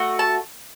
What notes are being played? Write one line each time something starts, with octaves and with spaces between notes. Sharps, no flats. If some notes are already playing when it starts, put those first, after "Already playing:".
Already playing: A3 F#4
A5